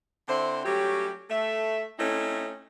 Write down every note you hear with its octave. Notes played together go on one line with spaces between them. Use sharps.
D3 C4 E4 C5
F#3 G3 A3 C#4 G4
A3 E5
A3 C4 C#4 D#4 E4 A4